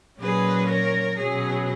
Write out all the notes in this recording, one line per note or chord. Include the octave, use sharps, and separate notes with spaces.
A#2 F#3 C#4 G#4 B4
A#4 C#5
B2 F#3 C#4 G#4